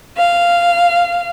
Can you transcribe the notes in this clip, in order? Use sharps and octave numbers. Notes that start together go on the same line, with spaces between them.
F5